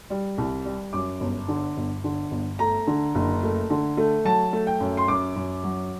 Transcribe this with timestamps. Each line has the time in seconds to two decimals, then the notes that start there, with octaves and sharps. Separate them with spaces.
0.10 G3
0.38 C2
0.65 G3
0.93 F#2 D6
1.20 G1
1.48 D3
1.77 G1
2.04 D3
2.31 G1
2.59 A3 A#5
2.87 D3
3.15 F#1
3.43 A3
3.70 D3
3.97 A3
4.25 F#3 A5
4.53 A3
4.67 G5
4.80 F#2
4.97 C6
5.08 F#2 D6
5.36 F#2
5.63 F#3